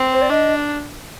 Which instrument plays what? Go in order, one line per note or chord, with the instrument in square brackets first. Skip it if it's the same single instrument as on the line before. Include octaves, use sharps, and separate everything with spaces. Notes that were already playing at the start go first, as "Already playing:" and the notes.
Already playing: [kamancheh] C4
[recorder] C5
D5
[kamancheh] D4 [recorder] D#5